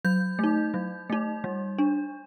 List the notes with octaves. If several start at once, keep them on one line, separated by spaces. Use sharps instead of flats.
F#3 G6
A3 D#4
F#3
A3 D#4
G3
D4